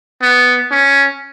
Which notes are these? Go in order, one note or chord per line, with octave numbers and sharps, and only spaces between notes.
B3
C#4